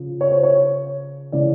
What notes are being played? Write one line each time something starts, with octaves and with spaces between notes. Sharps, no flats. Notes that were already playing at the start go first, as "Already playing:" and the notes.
Already playing: C#3 F3
C#5
C5
C#5
C#3 E3 D5